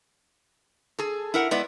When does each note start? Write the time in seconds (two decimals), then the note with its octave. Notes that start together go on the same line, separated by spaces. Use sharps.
0.99 G#4 A4
1.34 E4 A#4 F#5
1.51 G#3 B3 E4 D5